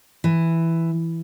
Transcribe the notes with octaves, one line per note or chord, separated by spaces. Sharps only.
E3